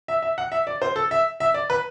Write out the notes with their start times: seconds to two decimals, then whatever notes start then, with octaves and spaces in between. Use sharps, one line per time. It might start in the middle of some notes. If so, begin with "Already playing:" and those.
0.08 E5
0.22 E5
0.38 F#5
0.52 E5
0.67 D5
0.82 C5
0.96 A4
1.11 E5
1.40 E5
1.54 D5
1.70 B4